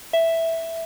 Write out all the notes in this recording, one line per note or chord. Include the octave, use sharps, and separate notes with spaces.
E5